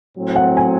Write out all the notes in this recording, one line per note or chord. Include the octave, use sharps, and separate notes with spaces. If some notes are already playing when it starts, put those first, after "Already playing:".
A2 F#3 C4
F#5
G#5